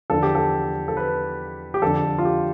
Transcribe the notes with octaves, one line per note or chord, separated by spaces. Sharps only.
E2 D3 F3 A4
G4
A4
A4
B4
G4
F2 D3 F3 A4
F4
G4